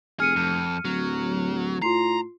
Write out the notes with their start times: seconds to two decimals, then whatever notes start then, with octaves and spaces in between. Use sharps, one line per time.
0.20 F1 G#4 F6 C#7 D#7
0.36 F2
0.85 D1 F#3
1.82 A2 F4 A#5 C6 C7